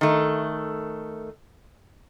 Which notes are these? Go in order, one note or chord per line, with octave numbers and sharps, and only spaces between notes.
D#3 A3